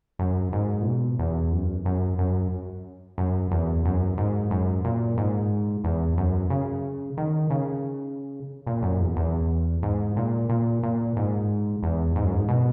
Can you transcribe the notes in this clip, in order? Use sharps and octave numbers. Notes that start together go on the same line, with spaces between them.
F#2
G#2
A#2
B2
E2
F#2
F#2
F#2
F#2
E2
F#2
G#2
F#2
A#2
G#2
E2
F#2
C#3
D#3
C#3
A#2
F#2
E2
E2
G#2
A#2
A#2
A#2
G#2
E2
G#2
F#2
G#2
B2